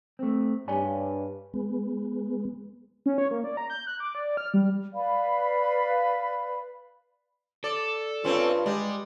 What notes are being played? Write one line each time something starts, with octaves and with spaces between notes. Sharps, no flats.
A3 C4
G2 C#5 D5 G#5
G#3 B3
C#4
C#5
A#3
D5
A#5
G6
F#6
D6
D5
F6
G3
B4 D5 F5 B5
A4 D5
G2 A3 C4 C#4 F4 B4
G3 G#3